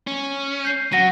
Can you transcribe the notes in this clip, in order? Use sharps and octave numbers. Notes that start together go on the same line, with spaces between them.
C#4
G6 C7
F#3 F#5 A#6 D#7